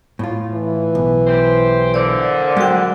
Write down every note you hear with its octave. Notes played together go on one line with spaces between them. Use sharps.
A2 F4
E3
B1
G4 C5
A#2 D3 C5 D5
F#3 G#3 F#4 G5